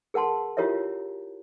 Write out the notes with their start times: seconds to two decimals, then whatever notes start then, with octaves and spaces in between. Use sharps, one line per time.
0.14 G#4 A#4 F#5 A5 C6
0.57 E4 F4 G4 A#4 C#5 E5